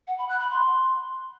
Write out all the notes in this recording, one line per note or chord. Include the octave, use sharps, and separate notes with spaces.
F#5
B5
F#6
B5
C6